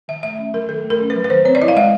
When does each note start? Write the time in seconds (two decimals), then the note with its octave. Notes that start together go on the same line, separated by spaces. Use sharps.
0.08 D#3 E5
0.23 A3 E5
0.38 C#4
0.54 F#3 A#4
0.69 D#3 A4
0.84 A3
0.90 A#4
1.01 C#4
1.10 B4
1.15 F#3
1.24 B4
1.30 D#3 C5
1.45 C4 C#5
1.55 D5
1.62 E4 D#5
1.68 F5
1.76 G#3 E5